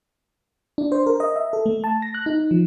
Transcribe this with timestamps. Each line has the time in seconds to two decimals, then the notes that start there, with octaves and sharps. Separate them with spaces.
0.78 D4
0.92 C5
1.06 A#4
1.20 D#5
1.36 E5
1.53 A4
1.66 A3
1.84 A5
2.02 A#6
2.14 F#6
2.26 D#4
2.51 F3